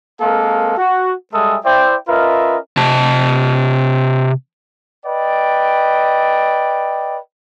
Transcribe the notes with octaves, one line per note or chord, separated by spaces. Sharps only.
G#3 A#3 C4 A4 A#4 F5
F#4
G3 G#3 A4 E5 G#5 D#6
E4 C5 D5 E5 G5
C#4 F4 A#4 B4 D#5 E5
C3 A5
B4 D5 D#5 G5